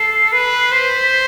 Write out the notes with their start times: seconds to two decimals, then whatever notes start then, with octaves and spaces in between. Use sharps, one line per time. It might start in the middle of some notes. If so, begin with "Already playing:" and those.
Already playing: A4 C7
0.32 B4 C7
0.71 C5 B6
1.11 B6